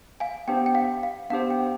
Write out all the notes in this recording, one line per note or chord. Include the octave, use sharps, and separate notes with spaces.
F5 G#5
B3 D4 G4 C5 G5
G5
F5
F5
B3 D4 G4 C5 F5
G5